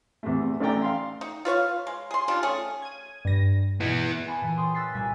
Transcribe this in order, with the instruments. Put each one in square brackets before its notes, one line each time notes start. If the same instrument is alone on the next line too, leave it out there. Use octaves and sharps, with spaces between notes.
[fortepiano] E2 C3 A3
A1 A3 A4 D5 G5 A#5
F5 C6
[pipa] D#4
F4 B4 C#5 F5
G#3
G#4 C6
D#3 G3 D4 F4
A3 C#4 G#4
[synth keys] G#6 D#7
G2 A#6
[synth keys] B2 [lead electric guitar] B3 E4
[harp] B4 G#5 A5 B5
A#2 E3
G#4 C#5 G5 C6 D#6
E6 F#6 A6 B6 C7
C2 A#2 G3 G#5 B6